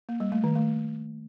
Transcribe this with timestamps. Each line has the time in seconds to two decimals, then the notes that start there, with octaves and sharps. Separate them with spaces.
0.09 A#3
0.20 G3
0.32 A3
0.44 D#3
0.55 A3